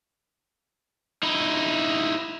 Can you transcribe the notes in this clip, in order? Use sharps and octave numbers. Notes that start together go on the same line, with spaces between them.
D#4 E4